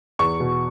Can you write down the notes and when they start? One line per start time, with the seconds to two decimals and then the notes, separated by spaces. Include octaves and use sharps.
0.19 E2 C#6
0.40 B2